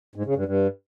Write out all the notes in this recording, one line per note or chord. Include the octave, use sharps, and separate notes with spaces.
G#2
C#3
G2
G2